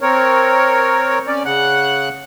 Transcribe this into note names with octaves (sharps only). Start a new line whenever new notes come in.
C4 A#4 C#5
C#4 D5
C#3 F#5 F#6